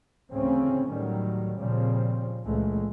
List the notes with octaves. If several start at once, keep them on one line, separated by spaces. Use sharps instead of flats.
D2 A2 C#3 E3 C4 C#4
A2 D#3 F#3 G3
A#2 C#3 F3 G3 C4
C#2 A#2 E3 G#3 A3